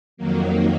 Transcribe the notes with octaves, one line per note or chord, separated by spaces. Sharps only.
F2 D#3 F#3 A#3